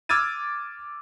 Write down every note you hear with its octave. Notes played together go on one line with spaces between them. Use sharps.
D6 E6 F6 G#6 A6 D#7